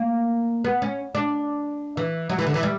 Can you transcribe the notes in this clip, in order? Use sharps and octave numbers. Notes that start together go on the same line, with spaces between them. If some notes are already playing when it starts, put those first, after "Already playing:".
Already playing: A#3
B3
C#4
D4
E3
F#3
E3
D3
E3
G3